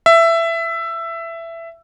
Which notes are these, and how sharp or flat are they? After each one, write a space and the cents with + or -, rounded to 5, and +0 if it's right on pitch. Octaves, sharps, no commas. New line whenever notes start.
E5 +15